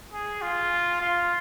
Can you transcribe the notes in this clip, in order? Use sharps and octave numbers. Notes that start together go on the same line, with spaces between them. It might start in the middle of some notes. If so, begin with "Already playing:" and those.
G#4
F4
F4